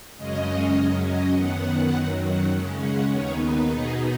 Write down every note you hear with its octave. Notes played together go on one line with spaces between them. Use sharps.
F#2 C#3 G#3 C#4 D#5
F#2 F#3 C#4
D#5
F#2 D#3 B3 F#5
F#2 D#3 F#3
F#5
C#3 G#3 C#4
F#5
D#2 D#3 B3 D#4 C#5
B4
B2 B3 D#4 G#4